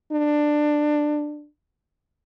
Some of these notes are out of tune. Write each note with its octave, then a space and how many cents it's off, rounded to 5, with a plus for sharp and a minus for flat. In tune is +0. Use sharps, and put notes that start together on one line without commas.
D4 +15